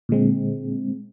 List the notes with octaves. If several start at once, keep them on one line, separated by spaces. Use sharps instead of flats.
A#2 D3 G#3 C4